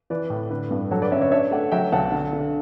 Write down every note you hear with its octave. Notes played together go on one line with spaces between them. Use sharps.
E3 B4 D5
A2
D3 B4
G2
F#3 A4 C#5
B4 D5
C#4 C#5 E5
C#5 E5
D4 C#5 E5
A3 D5 F#5
F#3 E5 G5
B1 F#5 A5
D3
D3